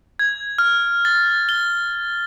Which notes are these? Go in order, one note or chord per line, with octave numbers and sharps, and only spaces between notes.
G#6
F6
A6
G7